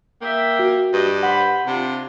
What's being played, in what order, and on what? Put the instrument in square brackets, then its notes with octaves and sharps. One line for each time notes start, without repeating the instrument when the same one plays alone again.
[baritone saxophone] A#3 [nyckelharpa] E5 G5
[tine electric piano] F#4
[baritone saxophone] G2 [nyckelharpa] D#5
[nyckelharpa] C5 B5 [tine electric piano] F#5
[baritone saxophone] C3 [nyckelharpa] D4 F4